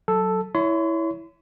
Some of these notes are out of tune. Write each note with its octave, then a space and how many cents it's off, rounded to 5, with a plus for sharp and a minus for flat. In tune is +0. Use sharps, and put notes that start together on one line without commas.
F#3 +5 A4 +0
E4 -5 C#5 +20 C6 -40